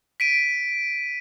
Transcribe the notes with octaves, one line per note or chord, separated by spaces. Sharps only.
B6 D7 D#7